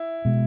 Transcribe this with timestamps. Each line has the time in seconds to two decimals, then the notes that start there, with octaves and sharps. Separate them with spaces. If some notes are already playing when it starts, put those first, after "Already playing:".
Already playing: E4
0.25 B2 G#3